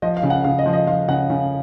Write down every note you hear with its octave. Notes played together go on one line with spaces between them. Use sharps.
F3 D#5
F5
C#3
F#5
C#3 F5
D#5
F3
D#5
F3 F5
C#3 F#5
C#3